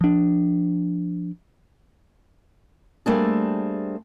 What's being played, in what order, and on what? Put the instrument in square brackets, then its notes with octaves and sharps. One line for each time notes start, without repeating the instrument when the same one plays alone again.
[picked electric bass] F3 D4
[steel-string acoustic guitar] G3 A3 A#3 C4 D4 G#4